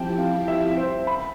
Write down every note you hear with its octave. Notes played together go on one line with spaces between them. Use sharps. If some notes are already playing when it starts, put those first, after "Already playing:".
Already playing: F3 C4 E4 G4 G5 A5
F5
E5
C5
B5